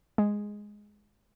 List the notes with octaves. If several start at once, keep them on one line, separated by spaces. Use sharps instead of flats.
G#3